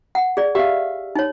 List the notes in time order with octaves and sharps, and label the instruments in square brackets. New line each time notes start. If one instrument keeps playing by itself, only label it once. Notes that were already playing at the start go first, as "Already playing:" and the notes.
[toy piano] F#5
G#4 D5
[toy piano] G4 [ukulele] E5 F5
[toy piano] D#4 C#5